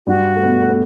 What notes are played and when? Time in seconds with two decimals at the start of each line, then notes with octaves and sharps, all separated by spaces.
0.07 G2 G3 F#4
0.36 A3
0.43 B2 B3
0.62 A3
0.69 B3